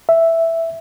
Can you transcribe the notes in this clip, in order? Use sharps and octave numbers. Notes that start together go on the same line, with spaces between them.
E5